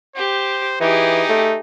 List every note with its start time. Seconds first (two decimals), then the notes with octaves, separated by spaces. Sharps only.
0.16 G4 C5
0.81 E3 D#4 G4 G#4
1.29 A3